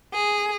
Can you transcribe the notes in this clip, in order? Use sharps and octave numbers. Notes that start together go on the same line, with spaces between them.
G#4